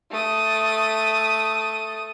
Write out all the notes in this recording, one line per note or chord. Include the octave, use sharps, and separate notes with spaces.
A3 D#6